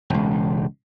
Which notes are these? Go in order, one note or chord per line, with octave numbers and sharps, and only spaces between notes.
E1 C#2